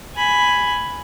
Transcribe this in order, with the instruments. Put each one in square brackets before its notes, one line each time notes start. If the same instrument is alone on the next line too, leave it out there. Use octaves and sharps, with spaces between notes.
[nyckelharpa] G#5 B5